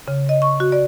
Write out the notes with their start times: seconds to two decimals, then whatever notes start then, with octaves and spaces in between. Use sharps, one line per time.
0.08 C#3
0.29 D#5
0.42 C#6
0.60 F#4
0.72 D5